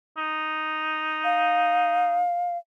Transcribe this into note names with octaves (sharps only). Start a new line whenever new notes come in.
D#4
F5